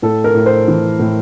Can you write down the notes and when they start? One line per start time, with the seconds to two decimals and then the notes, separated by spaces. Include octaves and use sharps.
0.02 A2 A4
0.24 A#4
0.34 A2
0.46 C5
0.68 E3
0.99 A2